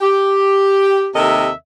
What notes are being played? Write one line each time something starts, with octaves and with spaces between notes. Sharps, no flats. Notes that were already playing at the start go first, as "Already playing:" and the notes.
G4
D#2 C3 A4 A#4 D#5 E5